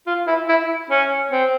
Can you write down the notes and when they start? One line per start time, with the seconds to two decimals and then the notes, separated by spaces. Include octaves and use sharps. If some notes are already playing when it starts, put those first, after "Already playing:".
0.06 F4
0.27 E4
0.48 E4
0.90 C#4
1.31 C4